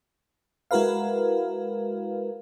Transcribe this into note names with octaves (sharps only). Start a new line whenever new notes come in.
G#3 E4 F#4 A#4 B4 F5